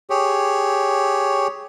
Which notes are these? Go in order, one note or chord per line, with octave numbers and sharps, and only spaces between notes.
G4 G#4 C#5